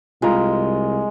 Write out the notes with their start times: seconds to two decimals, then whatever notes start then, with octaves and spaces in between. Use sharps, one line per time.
0.22 C2 G#3 F4 A#5